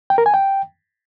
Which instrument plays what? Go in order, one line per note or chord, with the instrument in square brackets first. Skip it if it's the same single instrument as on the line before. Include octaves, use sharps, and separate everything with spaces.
[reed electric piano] G5
A#4
G#5
G5